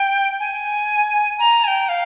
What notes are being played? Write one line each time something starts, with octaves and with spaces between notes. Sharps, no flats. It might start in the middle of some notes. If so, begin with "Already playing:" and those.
Already playing: G5
G#5
A#5
G#5
G5
F5